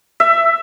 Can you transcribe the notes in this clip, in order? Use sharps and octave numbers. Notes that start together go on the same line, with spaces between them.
E5